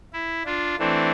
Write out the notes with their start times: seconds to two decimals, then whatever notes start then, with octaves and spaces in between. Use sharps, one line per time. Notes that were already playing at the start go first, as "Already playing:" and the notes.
0.13 E4
0.45 D4 F4
0.78 E3 A3 C4 D4